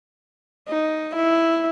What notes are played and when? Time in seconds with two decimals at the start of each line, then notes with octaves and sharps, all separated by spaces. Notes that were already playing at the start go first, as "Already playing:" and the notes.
0.68 D#4
1.16 E4